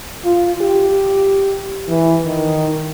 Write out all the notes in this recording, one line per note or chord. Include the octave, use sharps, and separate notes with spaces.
F4
G4
E3
D#3